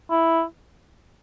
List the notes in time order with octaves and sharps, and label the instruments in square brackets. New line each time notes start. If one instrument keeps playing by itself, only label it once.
[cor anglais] E4